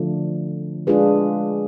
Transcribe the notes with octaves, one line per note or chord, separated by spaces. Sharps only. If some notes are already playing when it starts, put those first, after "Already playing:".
Already playing: D3 F3 A3 D4
G#3 D4 F4 G#4 B4